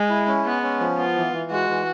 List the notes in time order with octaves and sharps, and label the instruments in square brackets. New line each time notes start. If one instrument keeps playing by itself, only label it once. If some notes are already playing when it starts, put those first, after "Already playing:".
Already playing: [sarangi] G#3
[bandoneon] E4
C#4
[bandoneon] G#3 [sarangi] B3
[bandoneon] C#4
F3
[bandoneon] B3 [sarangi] F4
[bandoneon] E3
E3
[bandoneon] G#3 [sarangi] F#4
[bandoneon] E3